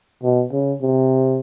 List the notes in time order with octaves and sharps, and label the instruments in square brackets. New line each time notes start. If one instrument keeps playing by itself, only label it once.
[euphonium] B2
C#3
C3